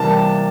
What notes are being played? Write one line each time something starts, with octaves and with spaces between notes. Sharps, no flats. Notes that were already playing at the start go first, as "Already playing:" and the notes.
Already playing: C3 E3 G3 A#3 A5